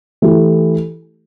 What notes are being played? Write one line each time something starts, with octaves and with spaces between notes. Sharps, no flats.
E3 A3 E4 G4